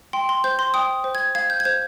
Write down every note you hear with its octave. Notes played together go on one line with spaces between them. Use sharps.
G5 C6
C6
C5 G6
C6
G5 D#6
C5
G#6
F5 G#6
G6
G#6
C5 G6